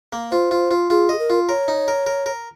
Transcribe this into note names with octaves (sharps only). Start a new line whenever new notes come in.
A#3
F4 C5
F4
F4
F4 G#4
G#4 D#5
A#4
F4
A#4 C#5
D#4
A#4
A#4
A#4